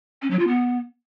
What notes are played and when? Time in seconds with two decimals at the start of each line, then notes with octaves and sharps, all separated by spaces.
0.22 C#4
0.31 F#3
0.39 F4
0.48 B3